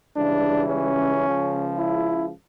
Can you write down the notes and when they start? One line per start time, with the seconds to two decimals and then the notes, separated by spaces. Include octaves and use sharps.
0.17 C#2 C#3 E3 G3 D4
0.70 C#4
1.24 C#2 C#3 F3
1.77 E4